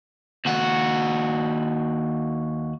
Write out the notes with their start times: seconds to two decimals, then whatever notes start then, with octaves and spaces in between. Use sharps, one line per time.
0.45 D#2 F#4